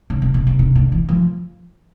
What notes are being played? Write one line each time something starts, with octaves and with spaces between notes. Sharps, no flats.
C#3
C3
B2
C3
C3
D3
E3
F3